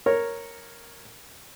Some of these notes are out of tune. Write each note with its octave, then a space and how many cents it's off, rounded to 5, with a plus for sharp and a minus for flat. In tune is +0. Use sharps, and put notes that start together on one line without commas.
A#4 +0 C#5 -5